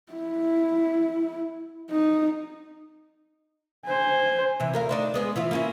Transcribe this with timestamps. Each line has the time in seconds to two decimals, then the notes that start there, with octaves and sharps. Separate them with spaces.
0.13 E4
1.91 D#4
3.85 C5 G#5
4.60 C3 E3
4.73 D2 A#4 F5
4.89 C4 D4 D#4
5.14 G#3 B3 G#4
5.36 E3 E4 F4
5.51 A#3 C#4 E4